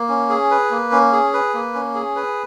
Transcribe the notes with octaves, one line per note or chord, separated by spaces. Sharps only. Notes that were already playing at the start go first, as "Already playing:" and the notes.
Already playing: A#3
C#4
G#4
B4
A#3
C#4
G#4
B4
A#3
C#4
G#4
B4